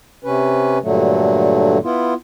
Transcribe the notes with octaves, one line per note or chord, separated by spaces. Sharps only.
C3 C#4 B4
G2 A#2 D3 F#3 A3
B3 E4 F4